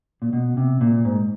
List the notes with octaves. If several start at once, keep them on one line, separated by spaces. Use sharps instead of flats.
A#2
B2
C3
A#2
G#2